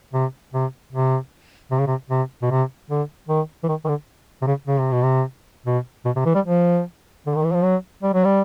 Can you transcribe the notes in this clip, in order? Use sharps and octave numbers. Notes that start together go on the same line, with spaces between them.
C3
C3
C3
C3
C#3
C3
C3
B2
C3
D3
D#3
E3
D#3
D#3
D3
C3
C#3
C#3
C3
B2
C3
B2
B2
C3
E3
G3
F3
D3
D#3
E3
F3
F#3
G3
F#3
G3